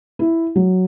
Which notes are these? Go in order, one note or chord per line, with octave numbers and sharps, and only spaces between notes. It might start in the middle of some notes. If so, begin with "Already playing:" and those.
E4
F#3